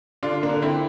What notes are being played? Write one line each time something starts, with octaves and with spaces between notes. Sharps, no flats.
D3 D4 F4
A#3 D4
D3
C4 E4